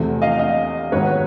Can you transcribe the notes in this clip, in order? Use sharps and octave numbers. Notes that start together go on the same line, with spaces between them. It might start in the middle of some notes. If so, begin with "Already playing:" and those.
Already playing: E2 C3 F3 A3
D#5 F5
D#5 F5
G#2 D#3 F#3 B3 B4 C#5